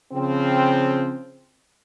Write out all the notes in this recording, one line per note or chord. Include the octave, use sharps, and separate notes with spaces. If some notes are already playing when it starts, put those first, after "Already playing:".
C#3 F3 C4